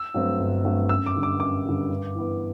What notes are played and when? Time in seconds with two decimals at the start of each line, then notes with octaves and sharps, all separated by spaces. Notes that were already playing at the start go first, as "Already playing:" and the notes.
Already playing: E6
0.14 G2 F#3 A3 C4
0.39 G1
0.65 G2 F#3 A3 C4
0.89 F#2 E6
1.06 D6
1.15 D3 G3
1.23 D6
1.39 F#2 D6
1.65 D3 G3
1.90 G2
2.15 E3 B3